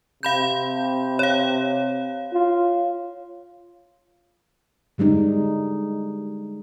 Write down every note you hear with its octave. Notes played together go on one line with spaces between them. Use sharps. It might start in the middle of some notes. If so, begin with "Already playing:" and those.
C3 F5 B5 G6
C#5 F5
F4
D3 G3 G#3 D#4